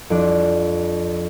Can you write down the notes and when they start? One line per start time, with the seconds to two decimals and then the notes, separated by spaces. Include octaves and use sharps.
0.10 F2 D4